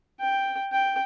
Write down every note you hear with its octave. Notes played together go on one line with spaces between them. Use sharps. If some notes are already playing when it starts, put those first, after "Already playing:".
G5
G5